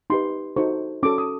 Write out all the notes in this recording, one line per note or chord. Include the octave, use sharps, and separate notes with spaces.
D#4 G4 B4 C6
D#4 F#4 A4 C5 C#6
C#4 F#4 A4 D6
D#6